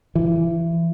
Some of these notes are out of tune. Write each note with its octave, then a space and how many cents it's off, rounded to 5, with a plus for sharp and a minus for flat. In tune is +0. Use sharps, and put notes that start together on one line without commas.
E3 +25